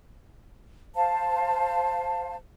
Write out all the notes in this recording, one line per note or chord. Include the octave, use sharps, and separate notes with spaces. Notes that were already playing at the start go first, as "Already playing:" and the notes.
C5 F5 A5